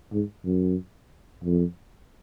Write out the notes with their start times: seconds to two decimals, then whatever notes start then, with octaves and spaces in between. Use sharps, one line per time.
0.13 G#2
0.46 F#2
1.44 F2